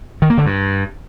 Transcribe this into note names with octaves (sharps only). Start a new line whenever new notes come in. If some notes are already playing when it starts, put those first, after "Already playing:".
D#3
A#3
D3
G2